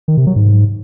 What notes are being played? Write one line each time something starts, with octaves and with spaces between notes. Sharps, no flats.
D#3
C3
F#3
G#2